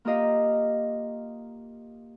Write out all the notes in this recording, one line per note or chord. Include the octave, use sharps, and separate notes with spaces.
A#3 F4 G4 D#5 F5